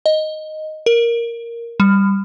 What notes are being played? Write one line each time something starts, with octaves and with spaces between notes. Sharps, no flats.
D#5
A#4
G3